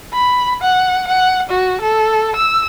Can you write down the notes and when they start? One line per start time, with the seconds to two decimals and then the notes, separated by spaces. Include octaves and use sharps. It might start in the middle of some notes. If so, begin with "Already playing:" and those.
0.13 B5
0.62 F#5
1.08 F#5
1.50 F#4
1.81 A4
2.36 E6